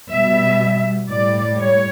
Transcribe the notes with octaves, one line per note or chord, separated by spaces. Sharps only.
B2 G3 E5
A2 G3 D5
C#5